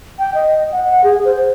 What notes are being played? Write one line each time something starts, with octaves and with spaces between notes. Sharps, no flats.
G5
D#5
F#5
G#4
C5